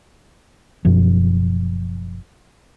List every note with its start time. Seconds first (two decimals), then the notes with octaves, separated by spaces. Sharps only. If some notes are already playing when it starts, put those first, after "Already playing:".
0.85 F#1 F#2 B2 F3